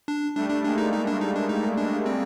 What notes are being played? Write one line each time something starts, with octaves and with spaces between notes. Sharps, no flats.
D4
G3 A3 D4
D4
G#3 A#3 D4
D#4
D#4
D4
D#4
D4
D#4
D4
C4